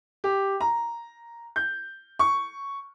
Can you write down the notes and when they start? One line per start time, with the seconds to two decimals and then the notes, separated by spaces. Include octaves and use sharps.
0.24 G4
0.60 A#5
1.56 G6
2.19 C#6